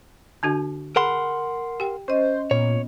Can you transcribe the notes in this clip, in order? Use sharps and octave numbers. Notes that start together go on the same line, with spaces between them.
D3 D4 F#4
G#4 A#4 F#5 B5 C6
G4 G5
C#4 C5 D#5
A#2 B3 C#5